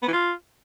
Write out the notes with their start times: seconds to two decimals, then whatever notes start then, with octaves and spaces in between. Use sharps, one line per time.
0.03 B3
0.08 E3
0.13 F4